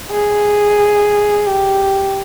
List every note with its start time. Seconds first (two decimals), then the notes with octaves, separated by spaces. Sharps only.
0.11 G#4
1.46 G4